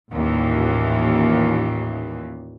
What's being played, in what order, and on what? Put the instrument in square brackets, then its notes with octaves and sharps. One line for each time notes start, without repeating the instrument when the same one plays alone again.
[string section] A1 D#2 A#2 E3